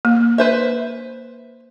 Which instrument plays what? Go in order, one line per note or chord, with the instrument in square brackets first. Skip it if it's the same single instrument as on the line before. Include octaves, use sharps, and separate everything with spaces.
[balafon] A#3
[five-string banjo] B4 C5 E5